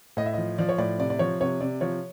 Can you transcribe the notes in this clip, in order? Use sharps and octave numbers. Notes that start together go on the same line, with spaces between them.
A2 D#5
E5
F3 D#5
F3 D5
C#5
A2 D5
C3 D5
D5
F3 C#5
C3 C#5
C3 D5
F3 C#5